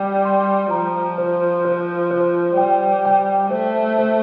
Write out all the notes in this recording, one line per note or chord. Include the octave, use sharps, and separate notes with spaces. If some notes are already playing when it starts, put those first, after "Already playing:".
Already playing: G3
C6
F3 A#5
C5
C5
C5
G3 G5
G5
A3 C5
C5